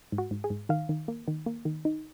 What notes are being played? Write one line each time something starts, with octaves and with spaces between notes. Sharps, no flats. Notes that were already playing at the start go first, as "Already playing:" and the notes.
G#2
F#4
G#2
G#4
G#2
D#3 F5
D#3
A#3
D#3
A#3
D#3
D#4